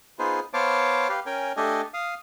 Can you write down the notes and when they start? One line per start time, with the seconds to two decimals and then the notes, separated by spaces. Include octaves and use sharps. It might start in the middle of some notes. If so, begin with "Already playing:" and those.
0.19 B3 D#4 F4 G#4 B4 C5
0.54 B3 C5 C#5 F5 A5 D6
1.09 G4 B4 F5
1.26 C#4 A#4 G5 G#5
1.57 A3 D4 G4 A4 D#5 G#5
1.94 F5 D#6